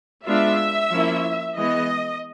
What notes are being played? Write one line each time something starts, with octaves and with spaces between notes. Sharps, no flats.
G#3 B3 D4 F4 E5
F3 A#3 C#4 E4
E3 G#3 B3 D#5